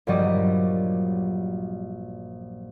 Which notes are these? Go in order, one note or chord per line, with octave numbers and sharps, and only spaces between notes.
A#1 G2 F#3 G3 D5 D#5